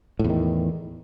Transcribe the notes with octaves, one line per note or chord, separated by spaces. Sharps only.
E2 A2 D#3